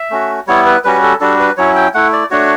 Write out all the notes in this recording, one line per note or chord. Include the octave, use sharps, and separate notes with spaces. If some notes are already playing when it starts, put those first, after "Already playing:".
Already playing: E5
A3 C#4 F#4
G3 B3 E4 C#5
B4
G3 C#4 F#4 B4
A4
G3 D4 F#4 A4
B4
F#3 C#4 E4 C#5
G5
A3 E4 F#5
D5
A3 D4 F#4 C#5